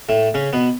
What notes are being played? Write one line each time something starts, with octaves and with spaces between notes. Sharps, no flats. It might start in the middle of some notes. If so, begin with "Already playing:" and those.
A2 A3
C#3 C#4
B2 B3